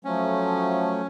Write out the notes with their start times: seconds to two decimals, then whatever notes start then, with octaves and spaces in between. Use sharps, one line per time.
0.05 F3 F#3 A3 C#4